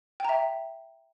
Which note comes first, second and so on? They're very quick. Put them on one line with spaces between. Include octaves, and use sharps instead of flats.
G5 A#5 E5